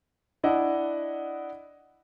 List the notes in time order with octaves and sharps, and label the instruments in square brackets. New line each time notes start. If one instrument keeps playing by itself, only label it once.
[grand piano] D4 E4 D#5 F#5